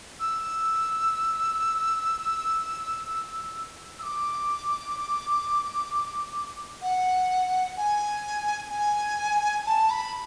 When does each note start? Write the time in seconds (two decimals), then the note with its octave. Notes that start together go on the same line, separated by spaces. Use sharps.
0.20 E6
3.99 E6
4.03 D6
6.82 F#5
7.77 G#5
8.72 G#5
9.66 A5
9.90 B5